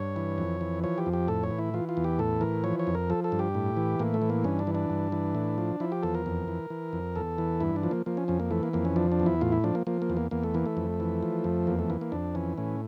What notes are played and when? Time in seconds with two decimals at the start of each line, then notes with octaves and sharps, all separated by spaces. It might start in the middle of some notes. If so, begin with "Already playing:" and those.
Already playing: G2 C#5
0.16 E3
0.38 F2
0.61 E3
0.84 F3 C#5
0.98 G4
1.06 F2
1.13 G4
1.28 A2 A4
1.43 C#5
1.51 E3
1.59 E4
1.74 E3 F4
1.89 F4
1.97 E2
2.04 G4
2.19 A2 A4
2.41 E3 A#4
2.64 F3 C#5
2.79 C#5
2.87 F2
2.95 A#4
3.10 F3 A4
3.24 A4
3.32 G2
3.39 G4
3.55 A2
3.77 E3
3.99 A2 A#3
4.14 A3
4.22 E3
4.30 A#3
4.44 G2 C#4
4.59 D4
4.67 E3
4.75 D4
4.90 G2
5.12 E3
5.35 A2
5.58 F3
5.80 F3 E4
5.92 G4
6.03 E2 A4
6.15 A#4
6.26 F2
6.48 E3
6.70 E3
6.93 F2
7.16 E2 A4
7.38 E3
7.60 G2 E4
7.76 D4
7.83 F3
7.91 A#3
8.06 F3 A#3
8.17 C#4
8.28 F2 C#4
8.40 A#3
8.51 E3 A3
8.63 A#3
8.73 F2 A#3
8.85 C#4
8.96 F3 D4
9.12 D4
9.20 E2
9.26 E4
9.41 A2 F4
9.52 E4
9.64 F3 D4
9.75 A#3
9.87 F3 A#3
10.02 A#3
10.10 E2
10.17 A#3
10.31 E2 A#3
10.43 A3
10.54 E3 A#3
10.66 A3
10.77 F2
11.00 E3
11.23 F3
11.44 F2
11.67 E2 A#3
11.79 A3
11.90 E3 A#3
12.01 A#3
12.12 F2 D4
12.35 E3 C#4
12.58 A2 C#4